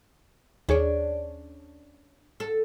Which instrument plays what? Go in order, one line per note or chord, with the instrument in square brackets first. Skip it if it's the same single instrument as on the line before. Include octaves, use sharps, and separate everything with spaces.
[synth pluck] D#2 G#4 C#5 [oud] C#4 D4
[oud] A4